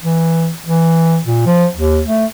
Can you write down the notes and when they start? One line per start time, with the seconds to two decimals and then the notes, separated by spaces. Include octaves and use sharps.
0.03 E3
0.66 E3
1.25 A#2
1.46 F3
1.76 D#2
2.07 A3